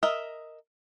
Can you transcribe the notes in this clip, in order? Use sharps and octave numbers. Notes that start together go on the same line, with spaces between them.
A#4 D#5 E5